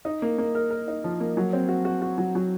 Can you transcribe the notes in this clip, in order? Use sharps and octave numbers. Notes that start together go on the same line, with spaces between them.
D#4
A#3
A#3
A#4
A#4
D#4
F3
A#3
F#3
C4
F#4
F#4
F#4
F#3
F#3